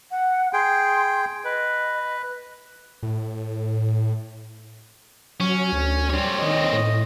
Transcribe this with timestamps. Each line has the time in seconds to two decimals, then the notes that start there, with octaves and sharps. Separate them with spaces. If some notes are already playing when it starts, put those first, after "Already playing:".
0.11 F#5
0.53 G#4 G5 C6
1.45 B4 D#5
3.03 A2
5.40 F#3 C#4
5.72 D2
6.09 G3 C4 C#5
6.42 D#3 D#5
6.73 A2